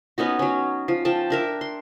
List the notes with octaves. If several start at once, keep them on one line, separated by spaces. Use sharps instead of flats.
B3 C#4 D#4 F#4
F#3 C#4
F3
F3 G5 A5
D4 A#4 E5
C6